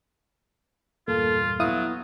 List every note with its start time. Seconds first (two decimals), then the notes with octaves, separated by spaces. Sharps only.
1.08 E2 G2 A#2 A#3 F4 A4
1.60 F#3 B3 E4 F5 D#6